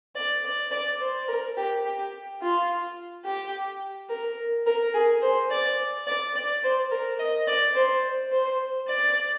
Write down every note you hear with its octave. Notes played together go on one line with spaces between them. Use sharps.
D5
D5
D5
C5
A#4
G4
G4
F4
G4
A#4
A#4
G#4
C5
D5
D5
D5
C5
A#4
D#5
D5
C5
C5
D5